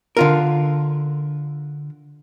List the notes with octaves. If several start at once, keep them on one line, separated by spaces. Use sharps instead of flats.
D3 F4 A#4